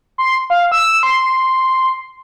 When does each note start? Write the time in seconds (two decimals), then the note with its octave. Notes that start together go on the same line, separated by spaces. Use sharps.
0.18 C6
0.50 F5
0.72 E6
1.03 C6